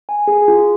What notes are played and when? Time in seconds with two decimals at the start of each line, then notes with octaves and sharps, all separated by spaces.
0.09 G#5
0.27 G#4
0.48 F4